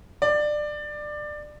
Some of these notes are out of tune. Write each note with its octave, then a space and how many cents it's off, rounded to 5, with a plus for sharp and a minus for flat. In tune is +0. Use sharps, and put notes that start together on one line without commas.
D5 +20